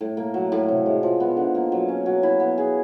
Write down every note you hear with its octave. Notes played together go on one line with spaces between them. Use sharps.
A2
A#3
F#3
A2
C3
G#3
F3
B3
D3
A#3
F#3
C#4
F#3
E4
B3
G#4